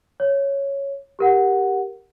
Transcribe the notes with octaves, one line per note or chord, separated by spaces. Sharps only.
C#5
G4 A#4 F#5